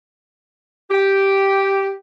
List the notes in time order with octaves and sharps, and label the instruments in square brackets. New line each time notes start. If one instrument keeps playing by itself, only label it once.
[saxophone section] G4